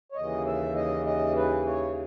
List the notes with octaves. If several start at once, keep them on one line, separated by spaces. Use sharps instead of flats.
C#5
D#2 C#3 E3 D#5
E5
D#5
D#5
B4
C#5